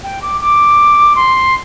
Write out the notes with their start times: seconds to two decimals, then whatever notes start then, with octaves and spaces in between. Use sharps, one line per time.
0.03 G5
0.22 D6
0.41 D6
1.16 C6